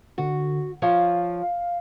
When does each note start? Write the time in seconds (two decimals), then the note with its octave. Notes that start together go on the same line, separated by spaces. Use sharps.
0.18 D3 F#4
0.82 F3 C#5 F5